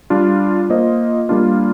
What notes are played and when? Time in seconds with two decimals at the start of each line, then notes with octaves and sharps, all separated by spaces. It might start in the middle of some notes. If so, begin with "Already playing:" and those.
0.10 G3 D4 F4
0.70 A#3 F4 C5 D#5
1.29 G3 A#3 D4 F4